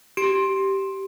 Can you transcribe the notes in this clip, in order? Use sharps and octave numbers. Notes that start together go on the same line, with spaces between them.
G4 D7